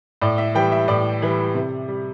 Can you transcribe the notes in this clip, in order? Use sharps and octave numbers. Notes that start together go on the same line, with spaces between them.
A2 D5
E5
E3 G3 G5
E5
A2 D5
E3 G3
C3
G3